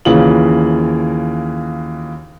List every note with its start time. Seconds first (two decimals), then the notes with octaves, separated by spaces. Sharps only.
0.05 D#2 C#3 E3 F4 F#7